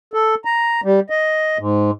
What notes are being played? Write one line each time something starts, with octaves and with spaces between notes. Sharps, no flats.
A4
A#5
G3
D#5
G#2